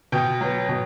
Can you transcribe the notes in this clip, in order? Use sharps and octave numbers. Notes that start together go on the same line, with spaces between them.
B2 G5
F#3 B3
B2